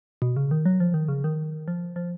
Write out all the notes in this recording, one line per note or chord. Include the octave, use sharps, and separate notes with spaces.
B2
C#3
D#3
F#3
F3
D#3
C#3
D#3
F3
F3